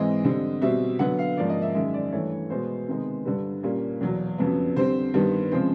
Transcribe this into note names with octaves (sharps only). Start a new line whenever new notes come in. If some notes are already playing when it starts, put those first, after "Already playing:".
Already playing: G#2 E3 G#3 C4 D#5
D3 G3 C4
B2 G3 C4 E5
D3 F#3 B3 F#5
F5
G#2 F3 A#3 C#4 D5
D#5
E5
F#2 D#3 G#3 E5
D5
G2 E3 A3 C#5
B2 G#3 B3 C5
C3 D#3 G#3 B3
G2 D3 G3 B4
A#2 G3 A#3 C#4
E2 B2 F#3
F2 C#3 F#3 B3
D3 G3 C4 C5
G2 D#3 G3 B3
C#3 F3 G#3 C4 C5